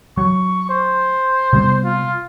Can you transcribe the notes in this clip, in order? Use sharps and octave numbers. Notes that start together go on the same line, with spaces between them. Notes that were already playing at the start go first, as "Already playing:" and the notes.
F#3 C#6
C5
C3 G3 B3
F4